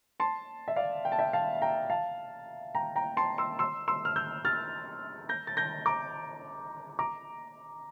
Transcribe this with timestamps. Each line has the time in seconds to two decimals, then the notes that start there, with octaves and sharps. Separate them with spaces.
0.20 A5 C6
0.68 E5
0.76 D5 F5
1.05 G5
1.12 A5
1.19 E5 G5
1.33 F5 A5
1.62 G5 A#5
1.90 F5 A5
2.75 G5 A#5
2.96 G5 A#5
3.17 A5 C6
3.38 C6 E6
3.59 C6 E6
3.88 C6 E6
4.05 F6
4.16 E6 G6
4.45 F6 A6
5.29 G6 A#6
5.47 A6
5.57 G6 A#6
5.86 A#5 D6
6.99 A#5 D6